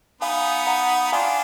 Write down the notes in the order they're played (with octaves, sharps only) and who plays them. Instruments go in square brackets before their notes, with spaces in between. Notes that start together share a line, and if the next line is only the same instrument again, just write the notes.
[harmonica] B3 D#4 [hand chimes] F5 G#5
[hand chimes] F#5 A#5
[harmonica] D4 F4 [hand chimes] F5 G#5